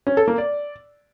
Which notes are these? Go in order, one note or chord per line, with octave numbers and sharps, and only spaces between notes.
C#4
A4
A#3
D5